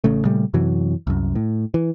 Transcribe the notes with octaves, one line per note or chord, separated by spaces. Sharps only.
A1 C#3 A3
A#2 C#3 G3 A3
F#2 C3 E3 F#3
C2 F#2
A2
E3